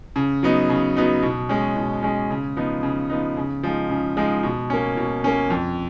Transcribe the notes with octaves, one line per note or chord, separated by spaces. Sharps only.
C#3
F#3 B3 D#4
C#3
F#3 B3 D#4
B2
G#3 C#4
B2
G#3 C#4
C#3
F3 B3 D#4
C#3
F3 B3 D#4
C#3
F3 G#3 D#4
C#3
F3 G#3 D#4
B2
A#3 C#4
B2
A#3 C#4
F2